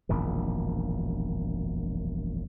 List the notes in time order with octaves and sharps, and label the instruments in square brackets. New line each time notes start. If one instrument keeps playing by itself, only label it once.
[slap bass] E1 A#1 F#2 D#3